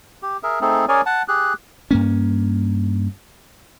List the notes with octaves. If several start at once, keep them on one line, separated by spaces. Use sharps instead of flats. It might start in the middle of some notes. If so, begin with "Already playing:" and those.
G4
G#4 A#4 E5
A3 C4 D#4 G#4 A4
C#4 G#4 A#4 C#5 D5 G#5
F#5 A5
G4 G#4 F#6
G2 A#3 C#4